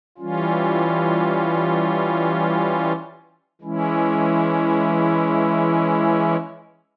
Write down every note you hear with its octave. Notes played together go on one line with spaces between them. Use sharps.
E3 G3 C#4 F4
E3 G#3 C#4 E4